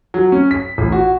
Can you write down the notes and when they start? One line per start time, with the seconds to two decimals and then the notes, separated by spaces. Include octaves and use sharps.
0.14 F#3
0.32 C#4
0.51 B6
0.78 A1
0.92 F#4